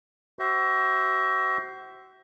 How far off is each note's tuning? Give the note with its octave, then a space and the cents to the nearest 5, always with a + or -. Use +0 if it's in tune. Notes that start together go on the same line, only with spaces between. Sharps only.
F#4 +35 C5 +0 E5 +0